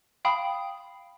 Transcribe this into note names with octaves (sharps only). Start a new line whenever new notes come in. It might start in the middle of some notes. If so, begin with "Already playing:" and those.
F5 G5 B5 D#6